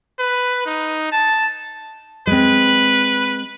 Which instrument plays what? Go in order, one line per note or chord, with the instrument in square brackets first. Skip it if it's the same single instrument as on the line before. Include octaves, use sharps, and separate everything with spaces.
[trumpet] B4
D#4
A5
[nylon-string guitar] G#3 C4 [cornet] B4